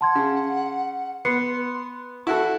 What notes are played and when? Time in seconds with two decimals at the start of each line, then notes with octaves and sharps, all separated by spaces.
0.01 F#5 A5 C6 G#6
0.15 C#3
1.25 B3 C6 C7 C#7
2.27 E4 F#4 A4 F#5